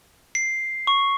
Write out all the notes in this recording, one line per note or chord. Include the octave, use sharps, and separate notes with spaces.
C7
C#6